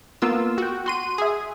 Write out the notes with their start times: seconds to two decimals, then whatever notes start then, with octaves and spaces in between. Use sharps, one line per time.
0.22 A#3 B3 F4 E6
0.58 F#4 G5
0.86 F#4 C6 D#7
1.18 G#4 E5